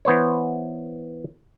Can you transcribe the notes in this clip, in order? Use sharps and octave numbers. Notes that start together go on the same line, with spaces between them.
E3 B3 C5 C#5